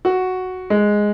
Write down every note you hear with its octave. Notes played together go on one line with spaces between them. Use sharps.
F#4
G#3